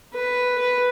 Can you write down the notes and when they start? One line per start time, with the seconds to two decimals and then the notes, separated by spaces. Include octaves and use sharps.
0.13 B4
0.58 B4